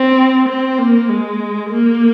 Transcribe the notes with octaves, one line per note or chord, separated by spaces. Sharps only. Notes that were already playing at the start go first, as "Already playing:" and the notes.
Already playing: C4
C4
A#3
G#3
A#3